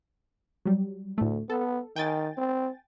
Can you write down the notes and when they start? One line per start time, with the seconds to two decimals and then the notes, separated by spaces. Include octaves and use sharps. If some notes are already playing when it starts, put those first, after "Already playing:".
0.65 F#3 G3
1.18 D2 A2 A3
1.50 B3 A4
1.96 D#3 G5 G#5 A6
2.38 C4